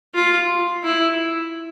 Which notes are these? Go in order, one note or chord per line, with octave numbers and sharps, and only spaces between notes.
F4
E4